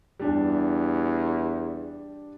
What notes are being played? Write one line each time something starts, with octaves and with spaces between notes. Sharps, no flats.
E2 G3 D4 G4